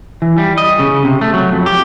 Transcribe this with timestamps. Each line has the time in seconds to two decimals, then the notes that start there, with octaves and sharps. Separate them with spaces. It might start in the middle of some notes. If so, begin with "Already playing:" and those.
0.22 E3
0.38 G3
0.58 D#5
0.79 C#3
1.05 C3
1.21 A3
1.34 F#3
1.52 F2
1.66 G4